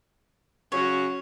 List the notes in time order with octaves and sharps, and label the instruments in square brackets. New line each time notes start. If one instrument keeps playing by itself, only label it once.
[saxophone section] C#3 F#3 C#4 F#4 [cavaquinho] C#5